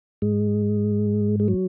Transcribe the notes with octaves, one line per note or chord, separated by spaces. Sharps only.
G#2 G#3
G#3
F#3